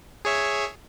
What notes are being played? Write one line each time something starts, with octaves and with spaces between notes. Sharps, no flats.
G#4 C#5 E5